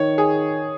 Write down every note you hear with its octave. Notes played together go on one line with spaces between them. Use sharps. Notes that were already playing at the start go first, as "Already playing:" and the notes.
Already playing: D#3 C#5
G#4